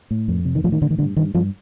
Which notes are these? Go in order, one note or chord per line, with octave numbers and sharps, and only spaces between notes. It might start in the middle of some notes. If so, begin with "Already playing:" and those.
A2
F2
C3
D#3
A2 F3
D#3
A2 D3
D#3
G2 D3
G2 D#3
G2 F3